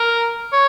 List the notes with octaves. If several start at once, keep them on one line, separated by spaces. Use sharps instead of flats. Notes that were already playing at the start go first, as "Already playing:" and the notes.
Already playing: A#4
C#5